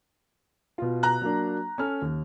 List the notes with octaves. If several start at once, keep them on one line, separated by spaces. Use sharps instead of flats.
B2 F4
A#5 F#6
F#3 A#3 D4
C#4 A4 F6
D#2